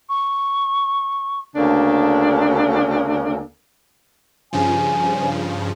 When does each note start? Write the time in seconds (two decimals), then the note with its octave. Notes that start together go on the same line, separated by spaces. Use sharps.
0.09 C#6
1.56 D2 C#3 A#3 D4 A4
4.53 G2 C#3 F3 G#5